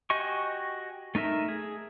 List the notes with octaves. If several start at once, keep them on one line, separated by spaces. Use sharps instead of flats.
F#4 G4 D#5 G#5 C#6
A3 D#4 A#4 E5
G#4